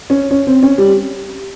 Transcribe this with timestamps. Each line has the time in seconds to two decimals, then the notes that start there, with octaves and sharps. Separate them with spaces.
0.10 C#4
0.31 C#4
0.47 C4
0.63 C#4
0.78 G3